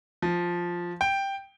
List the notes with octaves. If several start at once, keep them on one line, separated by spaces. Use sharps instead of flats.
F3
G5